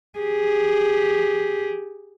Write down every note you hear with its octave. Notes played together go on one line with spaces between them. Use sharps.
G4 G#4